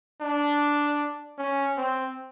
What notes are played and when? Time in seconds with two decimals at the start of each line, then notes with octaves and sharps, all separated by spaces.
0.21 D4
1.38 C#4
1.77 C4